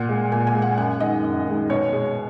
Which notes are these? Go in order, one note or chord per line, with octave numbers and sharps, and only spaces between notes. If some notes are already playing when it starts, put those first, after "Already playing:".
Already playing: A#2 F#5
G#3
A#2 G#5
G#5
G#3
F#5
F#2 F#5
D#3 G#3 D#5
F#2
D#3 G#3
B2 C#5
G#3